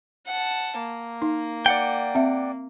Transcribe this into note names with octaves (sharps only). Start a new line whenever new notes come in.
F#5 A5
A#3
D#4
D5 F#5 G5
C4 E5